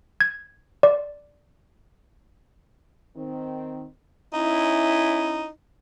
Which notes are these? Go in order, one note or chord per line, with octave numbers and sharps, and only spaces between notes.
G#6
D5
D#3 C4
C#4 D#4 E4